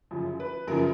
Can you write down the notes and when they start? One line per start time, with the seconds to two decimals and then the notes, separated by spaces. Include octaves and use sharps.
0.11 F#2 C#3 F3
0.40 B4
0.67 F#2 C#3 F3 A#4